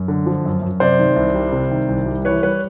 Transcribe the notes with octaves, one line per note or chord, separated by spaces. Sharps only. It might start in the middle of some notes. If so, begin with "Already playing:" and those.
Already playing: F#2
D3
F3
F#2
F#2
C3 C5 D5
D#3
C2
G3
C3
D#3
C2
G3
E3 B4 C#5
G3 B4 C#5